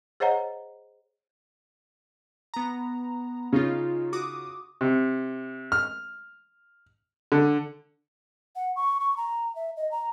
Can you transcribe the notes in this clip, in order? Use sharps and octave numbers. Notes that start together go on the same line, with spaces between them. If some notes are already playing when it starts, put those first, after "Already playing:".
G#4 C5 C#5 D#5 F#5 A#5
B3 A#5
C#3 C#4 D#4 F4
F#4 D6 D#6
C3
F6
D3
F#5
C#6
C#6
A#5
E5
D#5
A#5